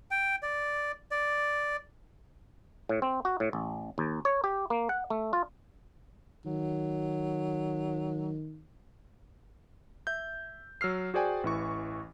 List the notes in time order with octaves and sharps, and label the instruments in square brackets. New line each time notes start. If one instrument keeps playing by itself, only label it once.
[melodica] G5
D5
D5
[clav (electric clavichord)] A2
C4
F#4
A2
A1
D#2
C#5
G4
A#3
F#5
A3
F4
[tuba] D#3 [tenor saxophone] F#3
[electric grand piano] E5 G6
F#3 E6 F6 C7
F#4 G#4 C5 D5 G5 G#5
A1 E3 C#6